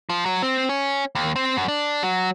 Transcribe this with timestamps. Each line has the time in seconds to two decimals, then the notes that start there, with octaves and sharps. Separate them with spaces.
0.10 F3
0.26 F#3
0.43 C4
0.69 C#4
1.15 D#2
1.36 C4
1.57 F#2
1.68 D4
2.03 F#3